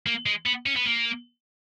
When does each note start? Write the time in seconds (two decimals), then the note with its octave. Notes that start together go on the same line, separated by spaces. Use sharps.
0.07 A#3
0.26 G#3
0.46 B3
0.66 C#4
0.76 B3
0.86 A#3